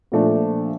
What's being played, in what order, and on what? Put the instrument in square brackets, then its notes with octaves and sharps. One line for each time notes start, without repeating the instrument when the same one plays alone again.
[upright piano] A#2 F3 A3 D4